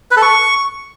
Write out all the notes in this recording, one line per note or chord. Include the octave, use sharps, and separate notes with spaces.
B4
A4
C#6